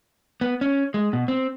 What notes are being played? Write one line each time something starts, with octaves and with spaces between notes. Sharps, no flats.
B3
C#4
G#3
B2
C4